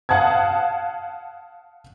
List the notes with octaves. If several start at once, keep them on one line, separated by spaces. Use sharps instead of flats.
F5 F#5 A5 D#6 G#6